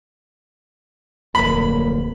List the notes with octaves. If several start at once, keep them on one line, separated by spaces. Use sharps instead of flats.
D1 F2 A#3 B5